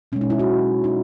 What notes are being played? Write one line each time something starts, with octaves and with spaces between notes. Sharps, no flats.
B2 G#3 C#4
D#4
E4
F#4
D#4